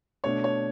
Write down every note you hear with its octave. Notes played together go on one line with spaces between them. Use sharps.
B2 A3 D4 C#5
C#5